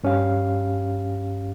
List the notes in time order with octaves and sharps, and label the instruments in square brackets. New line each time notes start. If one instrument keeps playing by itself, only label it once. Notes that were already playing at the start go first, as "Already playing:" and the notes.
[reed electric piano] G2 C#4 G4 F5